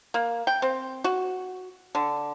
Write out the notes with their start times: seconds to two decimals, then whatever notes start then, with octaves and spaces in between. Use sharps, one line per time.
0.14 A#3
0.47 G5
0.62 C4
1.04 F#4
1.95 D3